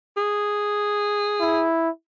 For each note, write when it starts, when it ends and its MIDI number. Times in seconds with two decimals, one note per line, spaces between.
0.17 1.66 68
1.41 1.90 64